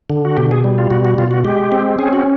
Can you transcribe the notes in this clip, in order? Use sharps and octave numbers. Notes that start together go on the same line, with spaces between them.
D3
F#4
B2 G4
G#4
G3
F4
B2 F#4
F#4
B2 F4
F#4
G#3 G4
C4
C#4 G#4
F#4